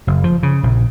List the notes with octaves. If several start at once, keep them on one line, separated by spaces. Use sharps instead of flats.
F#1
F3
C#3
A#1